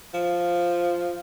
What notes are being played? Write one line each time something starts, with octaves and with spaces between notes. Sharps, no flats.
F3